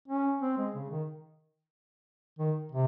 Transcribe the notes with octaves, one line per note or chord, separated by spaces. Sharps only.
C#4
C4
G#3
C#3
D#3
D#3
C3